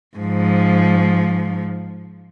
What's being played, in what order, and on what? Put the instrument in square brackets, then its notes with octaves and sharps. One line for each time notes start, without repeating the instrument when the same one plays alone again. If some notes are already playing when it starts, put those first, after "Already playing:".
[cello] G#2 F3